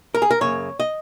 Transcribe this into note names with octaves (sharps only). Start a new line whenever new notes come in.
A#4
G#4
A#4
F#2 C#3 A#3 C#5
D#5